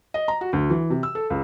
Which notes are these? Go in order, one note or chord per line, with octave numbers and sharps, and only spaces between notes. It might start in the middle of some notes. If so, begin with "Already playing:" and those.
D#5
A#5
F#4
D2
E3
C3
E6
A4
C#2